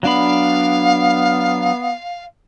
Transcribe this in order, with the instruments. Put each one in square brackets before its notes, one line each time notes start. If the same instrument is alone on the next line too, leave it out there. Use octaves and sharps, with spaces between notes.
[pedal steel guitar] F#3 D4 B5 [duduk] B3 [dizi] F5